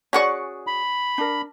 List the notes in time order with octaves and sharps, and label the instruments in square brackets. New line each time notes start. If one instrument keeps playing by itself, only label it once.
[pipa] C#4 F#5 C#6 [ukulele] F#4 G#4 D5
[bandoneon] B5
[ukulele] D4 A#4